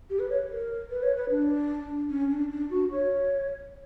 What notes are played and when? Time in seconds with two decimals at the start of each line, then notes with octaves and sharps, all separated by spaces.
0.10 G4
0.19 B4
0.30 C#5
0.50 A#4
0.90 B4
1.03 C#5
1.16 B4
1.30 D4
2.10 C#4
2.30 D4
2.51 D4
2.70 F#4
2.92 C#5